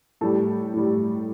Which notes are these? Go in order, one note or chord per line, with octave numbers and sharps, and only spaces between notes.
A2 G3 A4
A2 G3